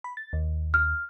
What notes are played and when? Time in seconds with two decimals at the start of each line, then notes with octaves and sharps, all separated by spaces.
0.04 B5
0.17 A6
0.33 D#2
0.74 F6